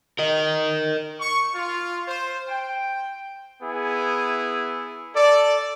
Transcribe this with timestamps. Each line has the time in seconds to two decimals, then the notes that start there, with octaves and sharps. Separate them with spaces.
0.19 A#4 D#5
1.20 C#6
1.55 F4
2.08 C5
2.49 G5
3.62 B3 E4 G#4
5.14 A4 D5